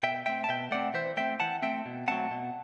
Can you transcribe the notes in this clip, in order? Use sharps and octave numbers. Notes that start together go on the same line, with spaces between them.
B2 E5 G5
A3 C4 E5 G5
A5
B2 E5 G5
A3 C4 D5 F#5
E3 C5 E5
A3 C4 E5 G5
E3 F#5 A5
A3 C4 E5 G5
B2
F#3 A3 C4 F#5 A5
B2